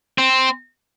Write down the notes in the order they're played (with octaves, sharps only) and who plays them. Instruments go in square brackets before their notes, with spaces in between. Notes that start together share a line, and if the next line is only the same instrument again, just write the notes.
[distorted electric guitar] C4